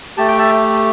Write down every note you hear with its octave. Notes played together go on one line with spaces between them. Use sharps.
A3 G4 A5
G5
E5 A5